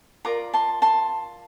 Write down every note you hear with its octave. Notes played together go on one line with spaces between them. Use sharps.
F4 A#4 D5 A#5 D6
A5 C6
A5 C6